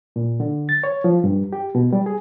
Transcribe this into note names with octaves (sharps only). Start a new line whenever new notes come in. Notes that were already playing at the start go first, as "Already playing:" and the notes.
A#2
D3
A6
C#5
F3
G2
G4
B2
G3
G#4